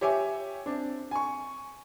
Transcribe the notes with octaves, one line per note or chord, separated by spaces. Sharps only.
G4 C#5 E5 G#5 D6
C4 D4
G#5 C#6